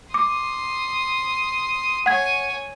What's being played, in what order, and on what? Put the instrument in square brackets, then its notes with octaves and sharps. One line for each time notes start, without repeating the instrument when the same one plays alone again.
[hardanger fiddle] C6 D#6 [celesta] D6
[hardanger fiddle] C#5 G#5 [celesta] F#5 G#6